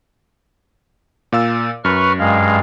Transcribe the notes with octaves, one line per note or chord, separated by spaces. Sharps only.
A#2 F5 E6
F#2 B4 C#6 F6
G2 G#3 F5